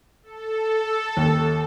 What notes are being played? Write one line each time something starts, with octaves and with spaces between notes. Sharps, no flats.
A4
D#2